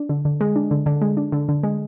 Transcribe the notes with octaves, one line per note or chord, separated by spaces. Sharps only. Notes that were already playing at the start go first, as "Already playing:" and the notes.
Already playing: D4
D3
D3
G#3
D4
D3
D3
G#3
D4
D3
D3
G#3